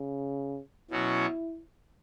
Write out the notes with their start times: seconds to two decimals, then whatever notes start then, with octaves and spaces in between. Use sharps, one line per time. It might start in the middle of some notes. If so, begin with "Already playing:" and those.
Already playing: C#3
0.90 B2 F#3 C#4 E4 F#4